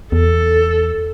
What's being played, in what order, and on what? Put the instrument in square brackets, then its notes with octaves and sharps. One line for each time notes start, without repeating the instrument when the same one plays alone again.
[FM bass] E2 [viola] A4